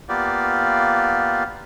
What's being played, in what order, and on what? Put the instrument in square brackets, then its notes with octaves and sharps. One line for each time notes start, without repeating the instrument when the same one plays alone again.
[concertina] A#3 B3 F4 G4 D5